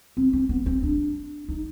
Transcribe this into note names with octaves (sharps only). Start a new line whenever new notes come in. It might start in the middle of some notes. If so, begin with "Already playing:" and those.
C4
C4
B3
C4
D4
D#4